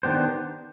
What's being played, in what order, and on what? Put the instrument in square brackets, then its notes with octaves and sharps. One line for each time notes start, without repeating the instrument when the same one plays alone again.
[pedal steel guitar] D#3 B3 D4 G4 C5